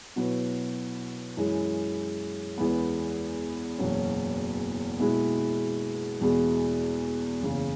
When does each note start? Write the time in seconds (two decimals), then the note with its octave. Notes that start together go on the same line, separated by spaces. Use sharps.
0.16 B2 F#3 E4 B4
1.37 F#2 E3 G#3 E4
2.58 E2 E3 G#3 B3
3.78 F#1 E2 B2 F#3 C#4
4.99 B2 G#3 E4
6.21 E2 B2 G#3 E4 G#4
7.41 F#1 E2 C#3